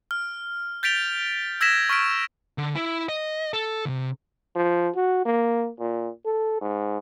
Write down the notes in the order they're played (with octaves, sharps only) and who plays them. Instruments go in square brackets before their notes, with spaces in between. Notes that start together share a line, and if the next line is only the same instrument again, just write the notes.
[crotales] F6
G6 A6 B6 D7 F7 G7
E6 G#6 A#6 B6 E7
C#6 F6 B6 D7
[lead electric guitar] D3
E4
D#5
A4
D2 C3
[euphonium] F3
F#4
A#3
A#2
A4
G#2